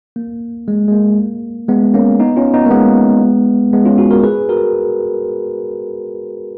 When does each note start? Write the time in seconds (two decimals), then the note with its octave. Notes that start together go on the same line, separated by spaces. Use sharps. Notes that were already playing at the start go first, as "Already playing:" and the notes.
0.16 A#3
0.68 G#3
0.88 G#3
0.92 A#3
1.68 G#3 B3
1.94 A#3 C#4
2.20 B3 D#4
2.36 C#4 F4
2.54 B3 D#4
2.66 A#3
2.71 G#3 B3
3.73 G#3 B3
3.85 C#4 F4
3.98 D#4 F#4
4.11 F#4 A#4
4.23 G#4 B4
4.49 F#4 A#4